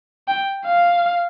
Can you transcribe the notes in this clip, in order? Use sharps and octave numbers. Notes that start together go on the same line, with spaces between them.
G5
F5